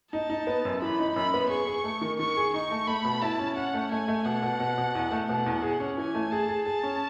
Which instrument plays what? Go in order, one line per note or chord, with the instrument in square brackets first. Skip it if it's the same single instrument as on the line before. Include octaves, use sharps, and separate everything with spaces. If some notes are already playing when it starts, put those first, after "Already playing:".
[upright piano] D#4 [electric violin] A5
[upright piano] D#4
B3
F#2
[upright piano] E3 [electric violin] B5
[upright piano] D#4
[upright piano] F#2 [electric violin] B5
[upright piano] B3
[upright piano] G#4 [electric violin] C#6
[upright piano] G#4
A3
D#3
[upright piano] D#3 [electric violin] C#6
[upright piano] G#4
[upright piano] D#4 [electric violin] C#6
[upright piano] A3
[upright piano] A3 [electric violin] B5
[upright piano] B2
[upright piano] E4 [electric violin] A5
[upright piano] C#4
[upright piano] C#4 [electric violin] F#5
[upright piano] A3
[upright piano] A3 [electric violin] G#5
[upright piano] A3
[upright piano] B2 [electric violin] F#5
[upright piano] B2
B2
B2
E2
A3
[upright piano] B2 [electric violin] F#5
[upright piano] E2
G#4
C#4
[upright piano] E3 [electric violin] G#5
[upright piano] A3
[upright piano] G#4 [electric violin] A5
[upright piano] G#4
[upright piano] G#4 [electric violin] A5
[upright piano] C#4